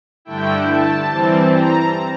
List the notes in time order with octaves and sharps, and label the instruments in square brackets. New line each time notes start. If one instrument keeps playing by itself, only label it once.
[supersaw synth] G2 D3 A3 E4 G5
A5
E3 G3 C4
A#5